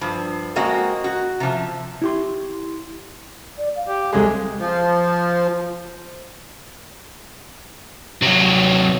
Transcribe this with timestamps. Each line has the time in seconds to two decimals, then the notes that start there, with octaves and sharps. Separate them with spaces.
0.01 G2 F3
0.56 G#3 A#3 C4 F#4 D#5
1.04 F#4
1.40 C3 F3
2.02 E4 G4 C6
3.58 D5
3.76 F5
3.88 G4
4.13 C2 C3 G#3 G#4 A4
4.59 F3
8.22 C3 F#3